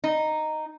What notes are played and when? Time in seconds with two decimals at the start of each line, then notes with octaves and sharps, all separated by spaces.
0.04 D#4